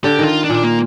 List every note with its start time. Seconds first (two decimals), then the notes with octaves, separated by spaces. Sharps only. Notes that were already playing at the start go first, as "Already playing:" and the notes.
0.04 D3 G4
0.19 D#3
0.24 F4
0.44 D4
0.50 A#2
0.64 A#3